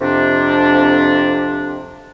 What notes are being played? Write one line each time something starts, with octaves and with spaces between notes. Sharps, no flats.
F2 C3 D4